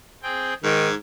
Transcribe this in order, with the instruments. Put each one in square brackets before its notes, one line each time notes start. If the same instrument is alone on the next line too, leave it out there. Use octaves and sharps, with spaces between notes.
[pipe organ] C4 G#4 G5
[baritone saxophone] G#2 [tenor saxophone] D#3 [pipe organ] D6 G#6